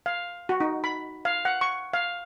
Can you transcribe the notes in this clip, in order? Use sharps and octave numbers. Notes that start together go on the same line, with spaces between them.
F5
F#4
D#4
B5
F5
F#5
C#6
F5